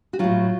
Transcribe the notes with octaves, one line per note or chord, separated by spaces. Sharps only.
F#4
A2 F#3 F4